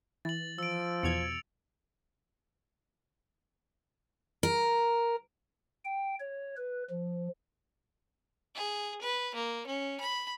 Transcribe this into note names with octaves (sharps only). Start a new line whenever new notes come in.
E3 A6 F#7
F3 E6 D7
E2 B2 G#6 C#7 F7
A#4
G5
C#5
B4
F3
G#4
B4
A#3
C#4
B5